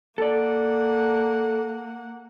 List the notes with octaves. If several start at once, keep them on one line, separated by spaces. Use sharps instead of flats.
A#3 A4 D5 F#5